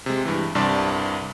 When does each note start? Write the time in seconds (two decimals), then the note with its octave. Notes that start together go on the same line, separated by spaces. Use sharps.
0.06 C3 G#3
0.25 G2 E3
0.55 C2 G2 C3 D5 A5 C6